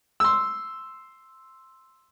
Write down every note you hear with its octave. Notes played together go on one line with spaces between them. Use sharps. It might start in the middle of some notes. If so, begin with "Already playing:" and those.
C6 E6